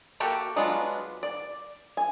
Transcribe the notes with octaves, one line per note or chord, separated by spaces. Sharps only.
A#3 F#4 G4 A4 E5
F#3 G#3 B3 D4 F4
D5
G#5